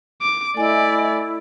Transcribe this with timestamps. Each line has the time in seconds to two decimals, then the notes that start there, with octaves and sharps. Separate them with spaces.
0.22 D6
0.57 A3 E4 D5 D#5 G#5